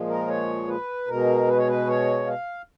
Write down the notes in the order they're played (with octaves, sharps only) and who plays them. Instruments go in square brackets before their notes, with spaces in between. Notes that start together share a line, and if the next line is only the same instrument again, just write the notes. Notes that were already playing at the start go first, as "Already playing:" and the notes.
Already playing: [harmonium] A#2 F3 G#3
A#4
C#5
B4
B2 G#3 A#4
B4
C#5
B4
C#5
F5